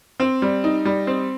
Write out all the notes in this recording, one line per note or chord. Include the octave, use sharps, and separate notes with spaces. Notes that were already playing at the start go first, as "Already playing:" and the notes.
C4
G3
D#4
G3
C4